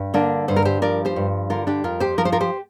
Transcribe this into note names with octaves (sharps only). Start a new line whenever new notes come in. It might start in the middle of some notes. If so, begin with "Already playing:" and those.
Already playing: G2
D3 A#3 D4
G2 C5
A#4
G4 C5
F3 A#4 D5
G4 C5
G2
D3 F4 A#4
D4 G4
F2 F4 A#4
G4 C5
F3 A#4
C5
F4 A#4
G4 C5